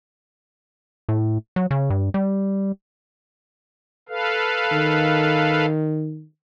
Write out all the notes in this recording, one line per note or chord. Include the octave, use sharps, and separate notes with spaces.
A2
F#3
C#3
G2
G3
A4 B4 F5
D#3